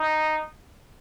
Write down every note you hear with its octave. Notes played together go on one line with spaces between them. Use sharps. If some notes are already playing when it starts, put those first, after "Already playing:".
Already playing: D#4